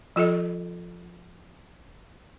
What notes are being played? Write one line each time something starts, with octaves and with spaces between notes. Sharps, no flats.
F3 F4 A4 D#5